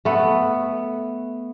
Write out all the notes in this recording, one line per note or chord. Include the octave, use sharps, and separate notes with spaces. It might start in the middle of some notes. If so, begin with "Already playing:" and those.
A3 B3